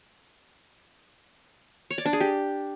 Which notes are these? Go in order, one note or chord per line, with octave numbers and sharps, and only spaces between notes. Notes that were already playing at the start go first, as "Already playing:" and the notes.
C#5
D5
D4
G#4
G4